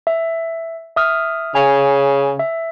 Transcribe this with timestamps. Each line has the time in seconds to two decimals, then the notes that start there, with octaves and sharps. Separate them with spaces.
0.07 E5
0.96 E5 D#6 F6
1.55 C#3 G#5
2.39 E5